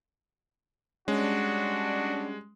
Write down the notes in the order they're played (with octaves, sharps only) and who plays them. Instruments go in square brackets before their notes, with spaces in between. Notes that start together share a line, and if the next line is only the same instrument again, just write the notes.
[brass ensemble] G3 D4 [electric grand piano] G#3 [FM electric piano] C#4 [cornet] F#4